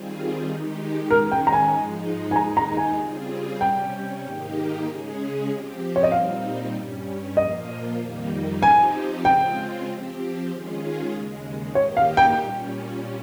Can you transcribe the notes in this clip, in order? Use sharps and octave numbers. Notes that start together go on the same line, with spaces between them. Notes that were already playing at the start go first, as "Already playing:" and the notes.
Already playing: D#3 G3 C4 F4 G#4
D#3 G#3 D#4 G4
D#3 G#3 C#4 A#4
G5
A#5
G#5
G#2 F3 G#3 D#4
G#5
D#2 D#3 G#3 D#4 A#5
A#5
G#5
C#3 G3 C4 F4 G#4
C3 G3 C#4 G5
G#2 D#3 A#3 D#4 G4
C#3 G#3 C#4 G#4
F3 C4 G4
C#5
D#5
A#2 G3 C4 D#4 F5
G2 G3 C#4
A#2 F3 A#3 F4 D#5
F2 D#3 G3 A#3 D#4
F3 C4 D#4 G4 G#5
C#3 G#3 C4 F4 G5
F3 C4 G4
D#3 G#3 C#4 F4 G#4
D#2 C#3 G#3
D#3 A#3 D#4 G4 C#5
F5
G5
A#2 G3 C#4